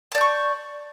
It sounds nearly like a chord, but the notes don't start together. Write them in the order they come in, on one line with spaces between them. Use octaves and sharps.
A5 D5 G6 C#6